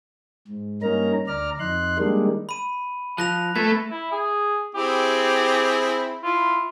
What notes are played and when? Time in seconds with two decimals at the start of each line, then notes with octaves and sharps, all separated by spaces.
0.48 G#2
0.82 G2 A#3 C#4 D#4 A#4 A#5
1.27 D2 D5 A#5 F6
1.60 F2 D#4 C6 F#6
1.98 D#3 G3 G#3 A#3 D4 D#4
2.49 B5 D#7
3.18 F3 F#6 A#6 F7
3.56 A3 B4 G#6
3.91 E4
4.11 G#4
4.75 C4 E4 G4 G#4
6.23 E4 F4